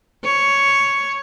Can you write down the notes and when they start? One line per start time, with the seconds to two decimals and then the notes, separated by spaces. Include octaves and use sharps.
0.24 C#5